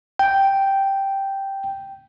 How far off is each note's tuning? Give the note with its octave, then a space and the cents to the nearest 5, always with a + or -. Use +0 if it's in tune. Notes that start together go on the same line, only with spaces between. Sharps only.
G5 -5